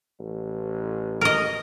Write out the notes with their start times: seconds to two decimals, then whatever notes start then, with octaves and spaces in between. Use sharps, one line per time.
0.20 A1
1.21 A#4 D#5